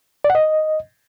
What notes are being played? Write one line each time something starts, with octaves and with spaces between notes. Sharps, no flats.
D5
F#5
D#5